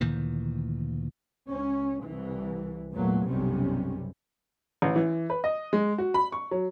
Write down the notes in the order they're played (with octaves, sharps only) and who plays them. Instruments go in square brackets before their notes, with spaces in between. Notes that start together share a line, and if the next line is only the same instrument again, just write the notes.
[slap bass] D2 A#2 D#3 E3
[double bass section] C#2 C#4
C2 E3
E2 A#2 F#3 A3
B1 F#2 C3 G3 C#4
[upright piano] A1
E3
B4
D#5
G#3
F#4
B5
C#6
F#3